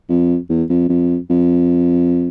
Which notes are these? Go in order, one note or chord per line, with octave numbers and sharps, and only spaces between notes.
F2
E2
F2
F2
F2